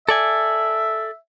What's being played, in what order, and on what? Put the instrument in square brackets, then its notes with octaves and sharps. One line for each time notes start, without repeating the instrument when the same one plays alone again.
[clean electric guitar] A4 D5 G#5 [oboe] E5